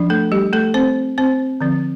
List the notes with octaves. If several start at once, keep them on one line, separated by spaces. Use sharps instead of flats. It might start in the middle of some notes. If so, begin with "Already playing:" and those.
Already playing: F3 D4
A3 A4
G3 G4
A3 A4
C4 C5
C4 C5
D3 F3 C4